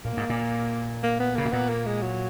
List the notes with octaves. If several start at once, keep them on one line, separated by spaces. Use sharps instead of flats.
A#2 A#3
G#2
A#2
A#3
B3
C#3 A#3
B2
A#2 B3
A#3
G#3
F#3